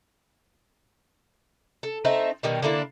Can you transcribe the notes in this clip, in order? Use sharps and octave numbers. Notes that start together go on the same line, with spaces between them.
A4
A3 C4 D#4 E5
B2 D#3 G3
D3 A#3 D4 E4